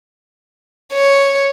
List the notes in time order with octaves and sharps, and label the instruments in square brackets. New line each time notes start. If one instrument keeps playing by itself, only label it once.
[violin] C#5